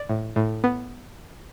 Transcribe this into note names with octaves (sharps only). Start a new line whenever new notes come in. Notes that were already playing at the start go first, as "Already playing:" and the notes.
Already playing: D5
A2
A2
B3